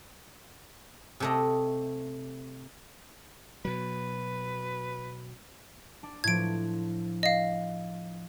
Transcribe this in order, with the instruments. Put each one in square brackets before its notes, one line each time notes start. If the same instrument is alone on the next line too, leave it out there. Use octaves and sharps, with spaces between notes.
[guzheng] C3 A3 D#5
[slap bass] B2 F#3 [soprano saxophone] B4
[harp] D4
[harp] A2 F3 [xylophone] G#6 D7
[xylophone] D#5 F5